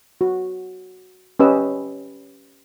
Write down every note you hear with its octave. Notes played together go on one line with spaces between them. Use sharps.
F#4
C#4 G4 B4 D#5 E6